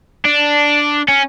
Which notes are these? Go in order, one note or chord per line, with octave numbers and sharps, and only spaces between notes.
D4
C#4